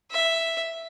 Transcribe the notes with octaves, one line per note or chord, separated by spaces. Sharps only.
E5